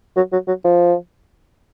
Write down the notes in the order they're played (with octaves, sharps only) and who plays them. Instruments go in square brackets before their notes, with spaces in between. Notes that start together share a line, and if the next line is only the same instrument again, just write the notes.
[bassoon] F#3
F#3
F#3
F3